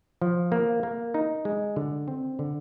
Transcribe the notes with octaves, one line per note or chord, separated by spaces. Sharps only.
F3
A#3
A#3
D#4
G#3
D3
C4
D3